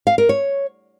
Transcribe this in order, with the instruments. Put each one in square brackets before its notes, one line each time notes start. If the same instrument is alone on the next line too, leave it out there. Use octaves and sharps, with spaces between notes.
[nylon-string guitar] F5
A#4
C#5